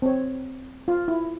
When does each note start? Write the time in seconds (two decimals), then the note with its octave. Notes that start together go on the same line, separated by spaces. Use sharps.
0.02 C4 C#5
0.88 F4
1.08 E4